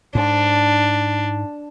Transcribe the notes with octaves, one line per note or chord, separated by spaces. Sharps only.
G#2 D4